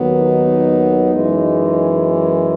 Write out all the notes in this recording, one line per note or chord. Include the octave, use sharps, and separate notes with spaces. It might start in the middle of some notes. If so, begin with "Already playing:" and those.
Already playing: D#2 D#3 F#3 B3
D#4
F#2 E3 G#3